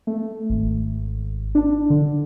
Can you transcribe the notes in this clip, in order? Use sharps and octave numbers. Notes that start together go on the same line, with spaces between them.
A3
G#1
D4
D3